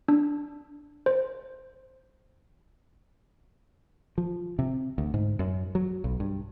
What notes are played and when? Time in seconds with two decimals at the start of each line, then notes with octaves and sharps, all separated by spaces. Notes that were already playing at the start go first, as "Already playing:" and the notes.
0.08 D4
1.06 C5
4.18 F3
4.59 C3
4.98 D2
5.14 G#2
5.39 F#2
5.75 F#3
6.04 B1
6.20 G2